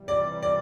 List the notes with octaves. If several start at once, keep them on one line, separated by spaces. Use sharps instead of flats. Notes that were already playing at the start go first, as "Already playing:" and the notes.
Already playing: C3 E3 G3
D5
D5